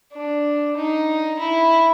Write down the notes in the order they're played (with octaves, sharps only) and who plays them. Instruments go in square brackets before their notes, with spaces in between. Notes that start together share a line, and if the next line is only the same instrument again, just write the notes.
[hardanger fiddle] D4
D#4
E4